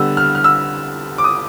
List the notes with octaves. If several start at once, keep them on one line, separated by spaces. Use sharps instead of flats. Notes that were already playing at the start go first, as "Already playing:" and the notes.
Already playing: D3 G3 B3 E6
F6
F6
E6
D6
D#6